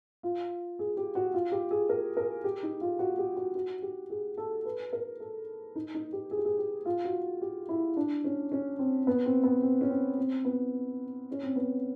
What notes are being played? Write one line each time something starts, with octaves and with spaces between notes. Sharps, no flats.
F4
G#4
G4
F#4
F4
G4
G#4
A#4
A#4
G4
D#4
F4
F#4
G4
F#4
F#4
G4
G#4
A4
B4
A#4
A4
D#4
D#4
G4
G#4
G4
G#4
G4
F4
F#4
G4
E4
D4
C#4
C#4
C4
B3
C4
B3
C4
C#4
C4
C4
B3
C#4
C4
B3